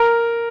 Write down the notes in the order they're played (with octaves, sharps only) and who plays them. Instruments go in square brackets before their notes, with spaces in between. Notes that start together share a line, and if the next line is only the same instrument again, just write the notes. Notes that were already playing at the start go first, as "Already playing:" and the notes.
Already playing: [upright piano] A#4